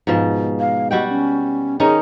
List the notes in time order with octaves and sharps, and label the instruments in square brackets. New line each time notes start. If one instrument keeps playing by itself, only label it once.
[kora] G#2 B2 F3
[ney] F5
[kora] G3 F#4 G5 [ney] D#5
[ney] C#4
[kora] D#3 C#4 D#4 [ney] G#4